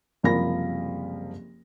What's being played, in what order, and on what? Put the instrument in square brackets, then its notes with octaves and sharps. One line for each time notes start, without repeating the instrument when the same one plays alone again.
[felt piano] F#1 C2 F3 A#4 B5 A#6